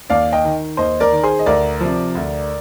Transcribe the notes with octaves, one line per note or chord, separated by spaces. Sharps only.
D#2 D5 F5
D#5 G5
D#3
D#2 C5 D#5
A#4 D5
D#3
G#4 C5
D#5
D2 A#4 D5
C3 F3
D2